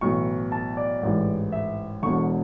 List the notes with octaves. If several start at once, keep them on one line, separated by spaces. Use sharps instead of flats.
B1 A2 E3 C#6
A5
D5
A1 G#2 E3
E5
E1 E2 D3 C#6